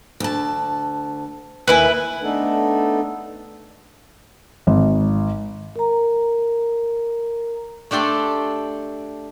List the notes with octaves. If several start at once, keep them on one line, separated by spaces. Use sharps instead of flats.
D2 A5
D#2 E4 B4 G#5
A3 B3 D4 D#4 A4
G#1
A#4 A#5
A3 D4 G4 A4 C6